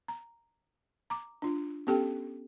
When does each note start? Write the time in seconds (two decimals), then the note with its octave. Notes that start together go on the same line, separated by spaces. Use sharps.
0.08 A#5
1.10 A#5 D6
1.42 D4 F4
1.87 B3 C#4 G4 A4 G5